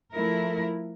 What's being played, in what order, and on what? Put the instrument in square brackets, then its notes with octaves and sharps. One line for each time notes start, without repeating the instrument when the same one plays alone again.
[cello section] F3 A3 E4 A#4